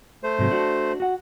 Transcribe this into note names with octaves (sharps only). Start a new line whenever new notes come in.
A3 C5
G#2 C3 F#3
D4 F#4
F#4 F#5